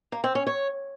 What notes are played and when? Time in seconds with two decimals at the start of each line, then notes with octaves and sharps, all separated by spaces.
0.12 A#3
0.24 C4
0.35 C#4
0.47 C#5